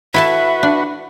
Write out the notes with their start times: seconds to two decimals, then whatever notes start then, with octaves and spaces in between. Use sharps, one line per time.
0.14 E4 F#4 A4 B4 E5 A5
0.63 D4